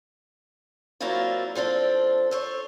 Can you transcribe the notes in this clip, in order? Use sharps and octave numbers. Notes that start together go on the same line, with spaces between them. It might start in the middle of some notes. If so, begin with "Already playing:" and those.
F#3 A#3 C4 D4 E4 F4
F3 C4 D4 A4
A4 C5 C#5